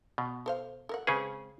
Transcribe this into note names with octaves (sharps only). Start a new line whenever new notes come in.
B2
A4 C5 F5
A4 A#4 F#5
C#3 G#3 C4 C#4 G#4 B4